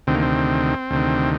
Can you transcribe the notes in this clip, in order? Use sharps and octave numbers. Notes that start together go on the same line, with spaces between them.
D2 C3 D#3 C4
A#3
C4
D2 C3 D#3